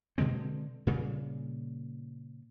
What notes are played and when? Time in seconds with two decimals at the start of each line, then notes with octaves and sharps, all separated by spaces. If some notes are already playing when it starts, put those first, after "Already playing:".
0.18 B2 D3 G#3 C4
0.87 A#2 C#3 G3